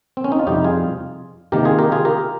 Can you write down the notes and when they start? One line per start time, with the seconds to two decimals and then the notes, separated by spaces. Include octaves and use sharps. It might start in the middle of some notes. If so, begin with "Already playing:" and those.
0.17 C4
0.24 C#4
0.32 D#4
0.39 F4
0.47 F2 C3 G3 D#4 G4
0.64 F4 G#4
1.52 C3 D#3 A#3 G4 A#4
1.65 F4 G#4
1.78 G4 A#4
1.92 F4 G#4
2.05 G4 A#4